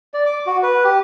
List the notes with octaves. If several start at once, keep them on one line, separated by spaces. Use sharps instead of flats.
D5
D6
F#4
B4
G4